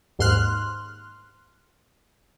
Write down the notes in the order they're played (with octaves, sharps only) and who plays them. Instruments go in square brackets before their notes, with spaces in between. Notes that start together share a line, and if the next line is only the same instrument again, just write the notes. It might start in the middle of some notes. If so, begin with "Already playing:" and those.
[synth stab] D#2 G#2 C6 F6 F#6